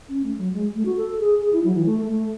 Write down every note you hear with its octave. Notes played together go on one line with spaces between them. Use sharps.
C#4
A3
F#3
G#3
A3
F#4
A4
G#4
G#4
E4
F#3
E3
A3
A3